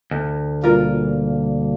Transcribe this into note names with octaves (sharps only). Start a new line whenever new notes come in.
D2
B2 G3 A#3 F4 A#4